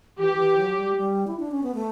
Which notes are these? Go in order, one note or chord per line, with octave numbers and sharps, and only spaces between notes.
E3 G4
E3
F#3
G3
A3
G3
E4
D4
C#4
B3
A3